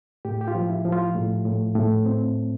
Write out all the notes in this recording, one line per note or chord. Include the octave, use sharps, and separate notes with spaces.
A2 G4
G4
F4
F3
E4
F3
F4
A2
A2
A2
C4